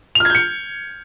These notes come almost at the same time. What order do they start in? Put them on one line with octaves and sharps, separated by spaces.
F7 F6 G#6 G6 C#7